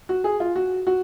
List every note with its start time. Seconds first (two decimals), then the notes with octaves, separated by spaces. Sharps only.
0.09 F#4
0.24 G#4
0.40 F4
0.56 F#4
0.87 F#4